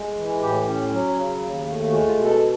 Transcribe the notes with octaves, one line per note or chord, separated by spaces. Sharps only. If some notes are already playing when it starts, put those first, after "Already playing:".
Already playing: G#3
E3
A2 G4
C#4
F#3
C#3
D#2
A3
G#3 F#4
F4
B2
A4